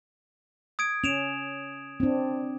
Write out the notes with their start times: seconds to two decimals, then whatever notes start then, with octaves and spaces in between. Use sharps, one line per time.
0.79 D#6 G#6 D7
1.04 C#4 D7 E7 F7
2.00 C4 D4